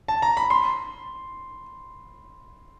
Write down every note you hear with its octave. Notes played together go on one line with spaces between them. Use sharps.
A5
A#5
B5
C6